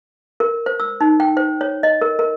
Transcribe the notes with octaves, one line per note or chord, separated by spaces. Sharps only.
A#4
C5
E6
D#4
G5
C5
C#5
D#5
A#4
A#4